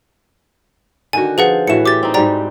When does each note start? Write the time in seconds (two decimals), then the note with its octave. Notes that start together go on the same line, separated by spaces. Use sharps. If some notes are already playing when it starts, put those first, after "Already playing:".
1.13 D3 D#3 F#4 G#5
1.38 F3 G#4 B4 F#5
1.67 A2 E3 F#4 C#7 E7
1.86 G4 E5 D6 A6
2.03 C4 D#4
2.14 G#2 G3 F#4 D5 G5 A#5